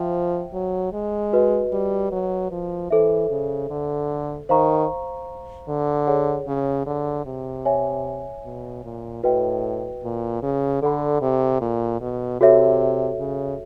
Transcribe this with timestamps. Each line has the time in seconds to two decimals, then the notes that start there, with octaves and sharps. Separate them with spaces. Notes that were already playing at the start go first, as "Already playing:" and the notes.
Already playing: F3 C5 E5 G5
0.53 F#3
0.93 G#3
1.33 F#4 B4 D#5
1.72 G3
2.12 F#3
2.51 F3
2.90 E3 A4 C5 E5
3.30 C#3
3.70 D3
4.49 D#3 C5 F5 A#5 C#6
5.68 D3
6.07 G#4 C#5 F#5
6.47 C#3
6.86 D3
7.26 C3
7.65 C#5 E5 G#5
8.44 B2
8.84 A#2
9.23 A2 F#4 B4 D#5 G5
10.03 A#2
10.42 C#3
10.82 D3 A4 D5 F#5 B5
11.21 C3
11.61 A#2
12.01 B2
12.40 C3 F#4 A4 C#5 E5
13.19 C#3